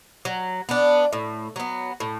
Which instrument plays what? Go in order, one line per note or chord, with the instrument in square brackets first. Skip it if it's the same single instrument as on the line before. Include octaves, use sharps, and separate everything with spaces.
[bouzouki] F#3
B3 D4
A2
F#3 B3
A2